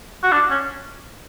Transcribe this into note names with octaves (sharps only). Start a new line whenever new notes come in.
F#4
D4
C#4